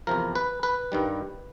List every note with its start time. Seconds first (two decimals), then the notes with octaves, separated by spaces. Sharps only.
0.07 E2 C3 F3 A#4
0.35 B4
0.63 B4
0.92 G2 D#3 G3